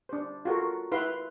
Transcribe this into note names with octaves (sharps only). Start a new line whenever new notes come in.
D4 C5
F4 F#4 A4 A#4
E4 B4 F5 C6